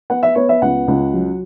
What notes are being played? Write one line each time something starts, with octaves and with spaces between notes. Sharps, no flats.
B3 F#5
E5
B3 C#5
E5
C#2 F#5
C#2
F#3